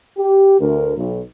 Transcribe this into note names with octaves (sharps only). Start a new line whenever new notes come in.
G4
D2 A#4
B1